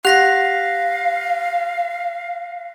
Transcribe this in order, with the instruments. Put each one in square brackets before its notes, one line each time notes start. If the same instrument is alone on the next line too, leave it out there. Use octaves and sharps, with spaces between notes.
[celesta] G4 F#5 F7 [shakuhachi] F5 [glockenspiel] F#6 A#6 B6